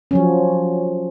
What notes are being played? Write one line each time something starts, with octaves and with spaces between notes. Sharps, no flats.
F3 F#3 C#4